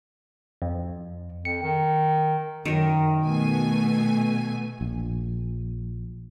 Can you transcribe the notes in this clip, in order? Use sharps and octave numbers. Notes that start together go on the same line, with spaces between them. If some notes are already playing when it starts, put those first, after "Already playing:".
F2
F2 C#7
D#3
F#2 D#3 A#4
B2 A3 G#5
A#1